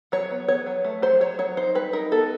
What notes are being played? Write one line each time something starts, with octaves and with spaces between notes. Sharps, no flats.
F#3 C#5
B3
B3 C#5
F#3
A3
F#3 C5
F#3 C#5
F#3 C#5
D#4 C5
G3 B4
D#4 A#4
B3 A4